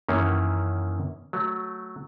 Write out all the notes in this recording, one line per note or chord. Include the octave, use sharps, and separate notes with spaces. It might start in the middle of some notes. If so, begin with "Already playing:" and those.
F#2 D#3 E3 A#3 C#4
F#3 A3